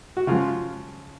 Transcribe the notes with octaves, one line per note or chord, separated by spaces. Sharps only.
F#4
C#3 F3 G#3 F4